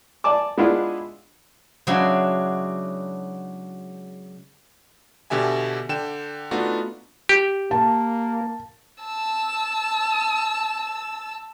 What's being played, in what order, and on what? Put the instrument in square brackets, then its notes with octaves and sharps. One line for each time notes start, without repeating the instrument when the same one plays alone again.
[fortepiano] D5 G#5 A5 D6
G#3 B3 D4 E4 F4 G#4
[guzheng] C#3 F#3 G#3 D4 E4 F#4
[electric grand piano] B2 D3 G4 E5 G#5
D3 G5 E7
A3 B3 D4 D#4 F4 F#4
[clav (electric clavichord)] G4
[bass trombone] A#3 [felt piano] A5
[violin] A5 E6